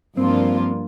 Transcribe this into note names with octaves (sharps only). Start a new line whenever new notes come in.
G2 F3 A#3 C4 D4 F4